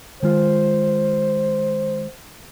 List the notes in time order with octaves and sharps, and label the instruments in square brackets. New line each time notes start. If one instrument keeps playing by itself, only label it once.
[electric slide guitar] D#3 G#3 F4 [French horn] C5